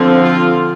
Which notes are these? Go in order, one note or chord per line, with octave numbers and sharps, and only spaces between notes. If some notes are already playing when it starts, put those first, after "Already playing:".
Already playing: D3 F3 C4
F4